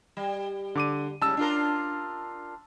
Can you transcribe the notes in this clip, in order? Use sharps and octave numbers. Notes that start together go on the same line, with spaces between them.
G3
D3 D6 D#7
G#2 C#3 G3 A5 E6
D4 F4 A#4